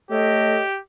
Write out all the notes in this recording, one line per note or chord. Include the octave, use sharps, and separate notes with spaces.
A3 G4 A4 C#5 D#5